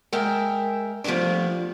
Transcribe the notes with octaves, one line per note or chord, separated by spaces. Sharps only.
G#3 A#4 E5 G5
F3 G3 A3 B3 D4